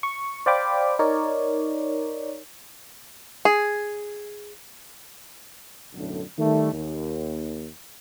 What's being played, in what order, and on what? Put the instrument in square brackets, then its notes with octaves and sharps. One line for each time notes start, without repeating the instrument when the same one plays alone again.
[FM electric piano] C#6
C5 D5 F5 G5 B5 D6
D#4 A#4 C#5 D5
[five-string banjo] G#4
[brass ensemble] B1 F#2 A2 D3
D#3 G3 A3
D#2